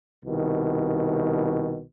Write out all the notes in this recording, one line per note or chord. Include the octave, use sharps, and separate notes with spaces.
C2 B2 D#3